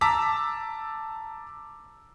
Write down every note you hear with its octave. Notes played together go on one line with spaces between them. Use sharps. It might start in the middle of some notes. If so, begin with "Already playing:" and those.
A5 A#5 D6 E6 B6